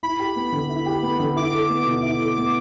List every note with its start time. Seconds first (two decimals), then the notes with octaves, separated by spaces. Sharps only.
0.03 E4 B5
0.19 G4
0.36 B3
0.52 D3
0.70 E4
0.86 G4
1.03 B3
1.20 D3
1.36 E4 D6
1.53 A4
1.70 B3
1.87 B2
2.03 E4
2.20 A4
2.37 B3